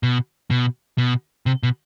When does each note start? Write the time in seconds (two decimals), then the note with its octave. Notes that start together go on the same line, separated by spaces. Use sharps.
0.03 B2
0.50 B2
0.98 B2
1.46 C3
1.63 B2